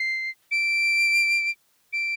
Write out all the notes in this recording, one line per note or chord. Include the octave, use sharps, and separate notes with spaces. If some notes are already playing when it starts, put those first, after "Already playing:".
Already playing: C7
D7
D7